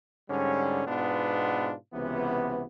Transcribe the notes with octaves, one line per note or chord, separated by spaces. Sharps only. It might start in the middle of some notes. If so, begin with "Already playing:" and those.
G#2 D3 G3 C#4
G#2 B2 B3 D4 F4
C#2 C3 E3 B3